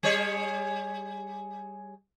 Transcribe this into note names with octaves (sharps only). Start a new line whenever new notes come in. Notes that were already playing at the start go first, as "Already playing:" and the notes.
G3 G#4 C#5